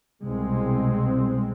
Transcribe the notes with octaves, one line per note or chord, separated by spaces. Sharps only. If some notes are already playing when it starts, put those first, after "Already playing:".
C2 B2 G#3 C4